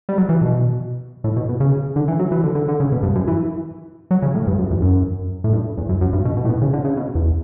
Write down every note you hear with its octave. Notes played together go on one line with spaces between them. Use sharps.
G3
F#3
E3
B2
A2
B2
B2
C#3
D3
E3
F#3
E3
D3
D3
D3
C#3
B2
G2
F#2
E3
F#3
C#3
A2
G2
F#2
E2
F#2
A2
G2
E2
F#2
F#2
G2
B2
B2
A2
B2
C#3
D3
C#3
B2
E2